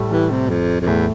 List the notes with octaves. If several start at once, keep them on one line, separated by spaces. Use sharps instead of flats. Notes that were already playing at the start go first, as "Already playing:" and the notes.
Already playing: A2 G3 A3
E3 G3
C3
F2
F2
E2 A2 A3